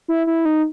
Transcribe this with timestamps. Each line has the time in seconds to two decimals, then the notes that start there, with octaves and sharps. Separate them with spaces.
0.08 E4
0.27 E4
0.45 D#4